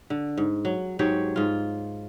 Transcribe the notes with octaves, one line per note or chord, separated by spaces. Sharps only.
D3
G#2
F#3
G#2 F#3 G4 C#5
G#2 F4